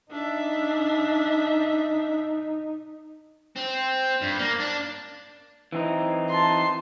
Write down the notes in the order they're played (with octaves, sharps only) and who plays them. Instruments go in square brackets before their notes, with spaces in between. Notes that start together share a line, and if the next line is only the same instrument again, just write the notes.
[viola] D4 E5 [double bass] D#4
[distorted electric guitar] C4
G2
A#3
D4
[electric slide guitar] E3 C4 D#4
[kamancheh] A5 C6